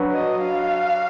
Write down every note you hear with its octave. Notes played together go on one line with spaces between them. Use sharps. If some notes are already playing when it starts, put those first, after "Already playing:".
Already playing: F#3 D4 F#4 B4
D#5
F5